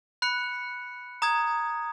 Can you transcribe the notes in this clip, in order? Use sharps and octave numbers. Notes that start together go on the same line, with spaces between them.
B5 F#6 C#7
A#5 D#6 G#6